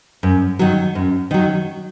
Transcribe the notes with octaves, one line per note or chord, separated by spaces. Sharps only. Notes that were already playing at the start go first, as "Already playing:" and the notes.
F#2
D#3 F#3
F#2
D#3 F#3